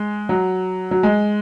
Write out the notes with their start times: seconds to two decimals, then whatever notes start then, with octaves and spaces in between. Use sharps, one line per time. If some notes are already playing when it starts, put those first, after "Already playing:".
Already playing: G#3
0.29 F#3
0.91 F#3
1.03 G#3